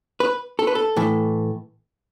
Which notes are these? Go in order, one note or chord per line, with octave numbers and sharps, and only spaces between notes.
B4
A4
B4
A4
A2 E3 A3